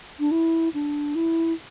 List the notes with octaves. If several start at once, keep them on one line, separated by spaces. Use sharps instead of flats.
D4
E4
D4
E4